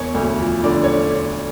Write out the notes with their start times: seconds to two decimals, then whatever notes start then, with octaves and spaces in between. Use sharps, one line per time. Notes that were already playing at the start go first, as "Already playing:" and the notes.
Already playing: E1 C#5
0.14 D2
0.40 F3
0.64 D3 D5
0.84 C#5